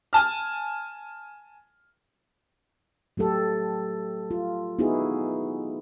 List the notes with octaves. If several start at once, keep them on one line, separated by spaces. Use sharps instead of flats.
G#5 A5 F6
F#3 A3 G4 A4
F4
B3 D#4 E4 F#4 G#4